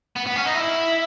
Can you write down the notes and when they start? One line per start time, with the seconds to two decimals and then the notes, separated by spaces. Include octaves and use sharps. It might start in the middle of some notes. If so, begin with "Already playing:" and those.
0.16 B3
0.26 B3
0.36 C#4
0.46 D#4
0.55 E4